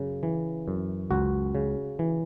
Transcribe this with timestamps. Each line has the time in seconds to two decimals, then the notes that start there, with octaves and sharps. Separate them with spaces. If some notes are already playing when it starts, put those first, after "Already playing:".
Already playing: F#2 C#3
0.23 E3
0.68 F#2
1.11 C#2 F#4
1.55 C#3
1.99 E3